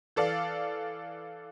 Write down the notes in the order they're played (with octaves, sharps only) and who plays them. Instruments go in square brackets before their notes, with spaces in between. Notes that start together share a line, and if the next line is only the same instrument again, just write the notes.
[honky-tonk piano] E3 A4 D5 F5